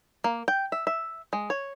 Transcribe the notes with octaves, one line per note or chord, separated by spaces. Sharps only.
A#3
G5
E5
E5
G#3
C#5